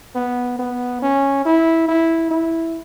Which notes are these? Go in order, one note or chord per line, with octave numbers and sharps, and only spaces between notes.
B3
B3
C#4
E4
E4
E4